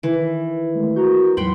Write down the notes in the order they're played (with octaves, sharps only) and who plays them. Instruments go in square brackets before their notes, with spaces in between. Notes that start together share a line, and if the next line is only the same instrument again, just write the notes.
[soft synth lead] D#3 [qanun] E3
[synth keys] G#3 A3
[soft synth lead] F#4 [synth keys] A#4 A#5 G6
[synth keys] E2 G#2 F#3 [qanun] F#5 G5 B5 [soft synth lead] C6